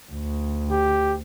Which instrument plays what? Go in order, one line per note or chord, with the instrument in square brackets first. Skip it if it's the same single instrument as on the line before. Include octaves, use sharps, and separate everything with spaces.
[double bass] D2
[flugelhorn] G4